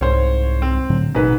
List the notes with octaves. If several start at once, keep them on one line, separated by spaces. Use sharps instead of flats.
C2 G#2 C5 C#5
C4
A2 D3 F#3
A1 G#2 B2 B4